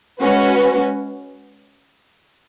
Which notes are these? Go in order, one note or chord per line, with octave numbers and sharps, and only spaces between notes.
G#3 C#4 F#4 B4